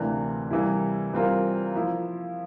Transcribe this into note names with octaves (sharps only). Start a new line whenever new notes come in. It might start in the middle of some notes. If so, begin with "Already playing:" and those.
Already playing: D2 C3 E3 A#3 D4
C3 E3 G3 A#3 E4
E3 G3 C4 F4 A#4
F3 A#3 E4